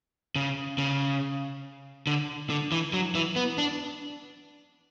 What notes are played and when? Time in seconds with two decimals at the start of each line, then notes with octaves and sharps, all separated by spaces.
0.36 C#3
0.78 C#3
2.07 D3
2.50 D3
2.72 E3
2.93 F#3
3.15 E3
3.36 B3
3.58 D4